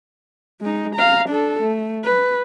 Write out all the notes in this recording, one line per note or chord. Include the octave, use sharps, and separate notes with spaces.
G#3 D#4
F5 A#5
D4 A4
A3
B4